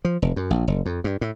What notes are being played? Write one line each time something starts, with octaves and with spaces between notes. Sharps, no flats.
F3
F1
F#2
A#1
F#1
F2
G2
A2